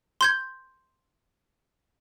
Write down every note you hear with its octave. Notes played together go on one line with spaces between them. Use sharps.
C6 G6 G#6